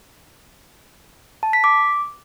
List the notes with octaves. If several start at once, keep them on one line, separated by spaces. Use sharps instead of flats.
A5
B6
D6